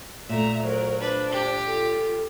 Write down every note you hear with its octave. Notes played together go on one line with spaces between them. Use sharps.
A#2 A3 E5 A#5
F#3 A#4 C5
D4 B4 C5
G4
F4 A4